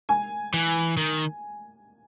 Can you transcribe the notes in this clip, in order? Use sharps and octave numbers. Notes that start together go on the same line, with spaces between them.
G#5
E3
D#3